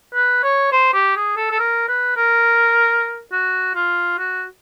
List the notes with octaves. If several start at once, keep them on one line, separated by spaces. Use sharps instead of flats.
B4
C#5
C5
G4
G#4
A4
A4
A#4
B4
A#4
F#4
F4
F#4